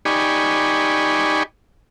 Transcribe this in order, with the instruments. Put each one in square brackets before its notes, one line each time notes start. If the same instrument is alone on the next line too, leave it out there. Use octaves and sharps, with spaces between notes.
[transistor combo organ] D#4 G4 D5 G#5 B5 C#6